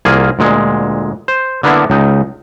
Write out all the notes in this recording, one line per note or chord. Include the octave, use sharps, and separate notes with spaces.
C2 A#3 F4 G#4
D2 A#2 G#3
C5
D3 A#3 B3 D4 E4
C#2 D#4